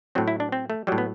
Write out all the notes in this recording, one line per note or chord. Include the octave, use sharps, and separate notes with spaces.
A2 F#3 C4
E4
D4
C4
A3
A2 F#3 G3
B3